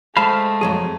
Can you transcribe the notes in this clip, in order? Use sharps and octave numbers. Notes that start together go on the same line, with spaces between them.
G#3 A3 C5 F5 A5 B5
F2 F#3 G#4